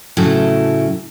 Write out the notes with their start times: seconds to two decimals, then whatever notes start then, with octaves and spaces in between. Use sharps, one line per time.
0.17 A2 C#3 F#3 A3 E4